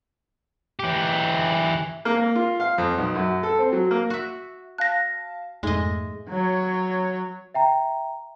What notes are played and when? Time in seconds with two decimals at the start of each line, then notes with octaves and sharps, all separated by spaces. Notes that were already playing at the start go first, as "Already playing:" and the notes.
0.79 E3 G4
2.05 A#3
2.17 A#3
2.36 F4
2.60 F5
2.78 F2
2.98 B1
3.15 F#2
3.43 A4
3.59 C4
3.72 F#3
3.91 A#3
4.10 F#4 E5
4.78 F5 A5 F#6 A#6
5.63 F2 G#2 B2 G#3 A3 D#4 D#5 E5
6.30 F#3 C#5
7.54 E5 G5 A#5